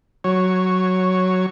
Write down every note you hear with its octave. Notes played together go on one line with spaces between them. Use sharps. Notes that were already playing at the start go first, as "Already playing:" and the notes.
F#3 C#5